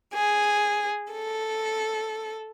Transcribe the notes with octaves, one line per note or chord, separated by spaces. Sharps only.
G#4
A4